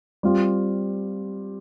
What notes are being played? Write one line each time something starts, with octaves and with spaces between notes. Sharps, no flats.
G3 C4 F4